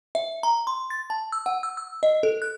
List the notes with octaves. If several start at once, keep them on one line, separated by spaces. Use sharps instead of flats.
E5
A#5
C6
A6
A5
E6
F#5
E6
E6
D#5
A4
F#6